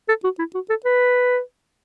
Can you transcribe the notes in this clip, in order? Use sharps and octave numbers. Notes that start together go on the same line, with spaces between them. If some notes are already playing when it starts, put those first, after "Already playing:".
A4
F#4
E4
F#4
A4
B4